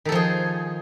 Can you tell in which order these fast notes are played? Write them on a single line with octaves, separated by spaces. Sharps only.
D#3 A4 F3 G#4